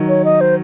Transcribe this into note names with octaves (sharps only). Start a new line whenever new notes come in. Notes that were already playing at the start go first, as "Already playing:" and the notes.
Already playing: D#3 F#3
C#5
D#5
C5